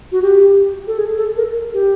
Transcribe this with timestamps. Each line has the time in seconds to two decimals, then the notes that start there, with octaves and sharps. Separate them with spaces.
0.12 F#4
0.22 G4
0.87 A4
0.98 G#4
1.17 A4
1.37 A#4
1.74 G4